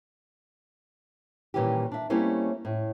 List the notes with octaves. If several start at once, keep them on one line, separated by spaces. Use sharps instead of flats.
A#2 D#3 E3 G3 C#4 G4
D4 E5
G3 A3 A#3 C4 C#4 E4
A2